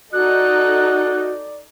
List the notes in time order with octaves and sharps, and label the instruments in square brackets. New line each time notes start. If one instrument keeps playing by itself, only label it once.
[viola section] D#4 A4 [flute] F#4 [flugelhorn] D5 [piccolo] F#6